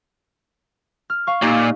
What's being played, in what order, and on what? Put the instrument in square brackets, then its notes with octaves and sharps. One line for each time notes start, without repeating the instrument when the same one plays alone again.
[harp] F6
F5 C#6
[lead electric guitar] A#2 [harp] D#4 G4 D#5